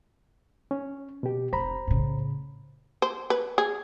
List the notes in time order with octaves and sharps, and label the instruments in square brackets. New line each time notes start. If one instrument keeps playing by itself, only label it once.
[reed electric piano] C#4
B2 G4
[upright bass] F1 [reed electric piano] C5 A#5 B5
[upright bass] A2 C#3
[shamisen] C5
B4
G#4